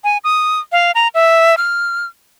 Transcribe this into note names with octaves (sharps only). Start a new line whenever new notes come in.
G#5
D#6
F5
A#5
E5
F6